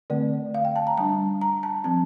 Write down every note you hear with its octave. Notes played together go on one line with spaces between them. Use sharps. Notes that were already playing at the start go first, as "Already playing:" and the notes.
D3 A3 C4 D5
F5
G5
A5
A#5
G3 D4 A5
A#5
A5
F3 C4 A5